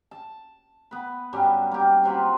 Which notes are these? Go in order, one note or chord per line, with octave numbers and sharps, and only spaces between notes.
A5
B3 B4
G2 F#3 G3 C#4
A#3 G4
C3 F#3 F4 B5